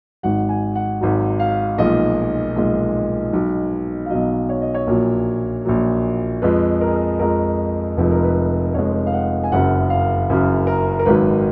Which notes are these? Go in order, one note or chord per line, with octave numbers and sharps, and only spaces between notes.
G#1 G#2 F#3 F#5
G#5
F#5
G#1 G#2 F#3
F5
B1 A#2 F3 G#3 D#5
B1 A#2 F3 G#3
B1 B2 F#3
F5
B1 B2 F#3 D#5
C#5
D#5
C#5
A#1 A#2 F#3
A#1 A#2 F#3
F2 F3 G#3 B4
A#4
G#4
A#4
F2 F3 G#3 A#4
F1 F2 F3 G#3 B4
A#4
B4
F1 F2 F3 G#3 C#5
F5
F#5
G#5
F#1 F#2 C#3 F#3 F#5
F5
F#1 F#2 C#3 F#3
A#4
A#4
G#1 G#2 D#3 F#3 B4